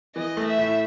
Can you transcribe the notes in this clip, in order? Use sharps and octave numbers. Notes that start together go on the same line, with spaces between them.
E3 D#5
A3
E5
A2